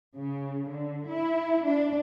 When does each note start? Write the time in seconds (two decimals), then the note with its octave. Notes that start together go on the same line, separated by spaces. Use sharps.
0.16 C#3
0.68 D3
1.08 E4
1.65 D4